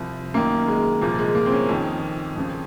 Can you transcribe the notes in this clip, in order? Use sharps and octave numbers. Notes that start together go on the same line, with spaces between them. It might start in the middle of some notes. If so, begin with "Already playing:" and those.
Already playing: C2 C3 F3
F#2 D#3 A#3
G#3
C2 A#2 F3 A#3
G#3
A#3
C4
C#4
F2 D#3
F2 C#3 F3